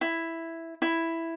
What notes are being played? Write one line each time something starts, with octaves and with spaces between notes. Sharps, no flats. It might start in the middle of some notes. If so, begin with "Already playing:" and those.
E4
E4